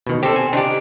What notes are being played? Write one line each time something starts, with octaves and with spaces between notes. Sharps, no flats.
B2 D#3
C4 G4 A4
G#5
D#3 D4 G4